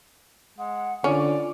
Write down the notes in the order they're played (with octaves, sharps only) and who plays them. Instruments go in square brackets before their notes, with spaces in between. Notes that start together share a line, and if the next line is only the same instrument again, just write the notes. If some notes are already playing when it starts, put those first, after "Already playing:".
[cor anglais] G#3 [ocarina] F#5
[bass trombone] D3 [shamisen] C#4 [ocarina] F4 [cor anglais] D5